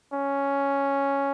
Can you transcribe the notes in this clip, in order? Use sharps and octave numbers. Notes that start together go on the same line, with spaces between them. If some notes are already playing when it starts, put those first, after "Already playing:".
C#4